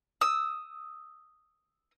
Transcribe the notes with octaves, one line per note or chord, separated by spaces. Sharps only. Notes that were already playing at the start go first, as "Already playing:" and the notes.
D#6 E6